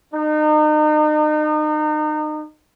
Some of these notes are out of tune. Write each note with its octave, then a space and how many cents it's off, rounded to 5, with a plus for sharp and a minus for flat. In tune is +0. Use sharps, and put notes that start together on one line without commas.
D#4 -35